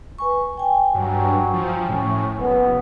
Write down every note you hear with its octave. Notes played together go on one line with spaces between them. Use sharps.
B4 G#5 C#6
G5 G#5
G2 F#3
F3
A2 C#4
F#1 B3